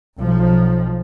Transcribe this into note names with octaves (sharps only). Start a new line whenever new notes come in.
B1 F3